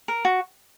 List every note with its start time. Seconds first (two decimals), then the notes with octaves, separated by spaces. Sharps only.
0.08 A#4
0.25 F#4